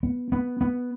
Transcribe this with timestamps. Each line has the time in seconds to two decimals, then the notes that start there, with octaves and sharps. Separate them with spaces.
0.03 B3
0.32 B3
0.61 B3